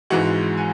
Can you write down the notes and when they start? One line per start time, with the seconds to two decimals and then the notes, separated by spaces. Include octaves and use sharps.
0.10 G#1 G#2 E3 G#3 F#4 F#5
0.57 G#5